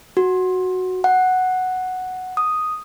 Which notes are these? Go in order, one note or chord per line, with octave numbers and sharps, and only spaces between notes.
F#4
F#5
D#6